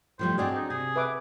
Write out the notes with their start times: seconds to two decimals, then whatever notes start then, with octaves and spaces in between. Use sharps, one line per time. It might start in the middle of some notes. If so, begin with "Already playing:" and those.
0.19 A2 F3 G3 C5
0.38 G#3 C4 D4 F#4 G#4 D5 G5
0.55 D#4
0.70 C3 G#4
0.96 B4 E5 D6